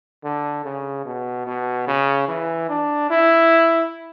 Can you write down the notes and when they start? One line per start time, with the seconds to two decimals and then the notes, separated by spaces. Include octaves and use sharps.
0.24 D3
0.65 C#3
1.06 B2
1.47 B2
1.88 C#3
2.28 E3
2.70 D4
3.10 E4